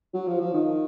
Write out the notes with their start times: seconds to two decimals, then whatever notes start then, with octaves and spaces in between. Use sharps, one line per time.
0.14 F#3
0.27 F3
0.41 F3
0.54 D#3